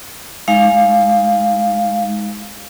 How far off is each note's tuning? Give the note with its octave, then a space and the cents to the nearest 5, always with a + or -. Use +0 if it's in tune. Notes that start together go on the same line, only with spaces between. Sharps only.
G#3 +0 D#4 +30 F5 +0